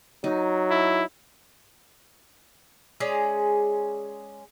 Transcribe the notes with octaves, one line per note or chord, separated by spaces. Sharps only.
F#3 D#4
E4
G#3 C#4 G#4 D5